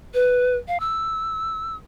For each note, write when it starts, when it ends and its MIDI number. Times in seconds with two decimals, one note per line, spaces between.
0.14 0.56 71
0.68 0.78 77
0.80 1.76 88